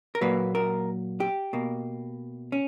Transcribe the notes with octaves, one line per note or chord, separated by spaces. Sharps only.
A#4
A#2 F#3 A#3 B4
A#4
G4
B2 A#3
C#4